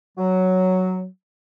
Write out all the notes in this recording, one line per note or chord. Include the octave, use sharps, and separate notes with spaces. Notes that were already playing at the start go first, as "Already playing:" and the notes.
F#3